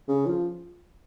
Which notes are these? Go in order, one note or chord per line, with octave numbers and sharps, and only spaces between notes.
C#3
F3